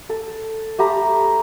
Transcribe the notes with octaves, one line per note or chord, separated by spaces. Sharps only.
A4
A3 G4 A#5 B5